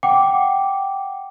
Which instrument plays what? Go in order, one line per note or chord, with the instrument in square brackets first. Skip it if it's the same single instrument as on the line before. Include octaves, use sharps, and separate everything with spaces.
[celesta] F#5 G5 D6